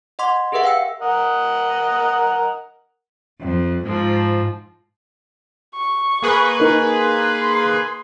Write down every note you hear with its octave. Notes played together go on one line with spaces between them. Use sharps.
D#5 F#5 C6 D6
G4 G#4 A#4 B4 E5 F#5
F5 G5 E6 C#7
A#4 D#5 F#5
F2
G#2 F3
C#6
A#3 G#4 B4
D#4 A#4
C6